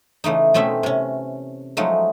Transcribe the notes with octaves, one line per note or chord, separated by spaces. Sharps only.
C#3 E3 A3 D#4
B2 A3 C4 C#4 E5
C3 C#4
F3 F#3 G#3 A3 D#4